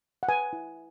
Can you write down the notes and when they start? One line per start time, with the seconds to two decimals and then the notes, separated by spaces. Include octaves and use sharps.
0.23 F#5
0.29 B4 G#5
0.53 E4